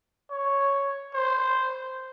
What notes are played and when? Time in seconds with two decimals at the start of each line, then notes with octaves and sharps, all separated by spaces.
0.31 C#5
1.14 C5